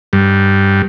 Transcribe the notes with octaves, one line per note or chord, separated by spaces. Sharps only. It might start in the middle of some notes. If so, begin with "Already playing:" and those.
G2